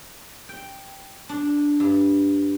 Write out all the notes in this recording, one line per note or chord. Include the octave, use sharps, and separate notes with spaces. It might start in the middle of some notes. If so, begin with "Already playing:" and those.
G5
D4
G2